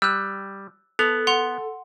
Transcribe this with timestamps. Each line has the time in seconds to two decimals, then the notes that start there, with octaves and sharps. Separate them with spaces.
0.02 G3 E6 F#6
0.99 B3 A4 F7
1.27 F#5 C6 F7